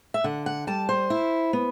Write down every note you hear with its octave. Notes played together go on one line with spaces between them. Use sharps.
E5
D3 F#5
F#5
G3 A5
C5
E4
B3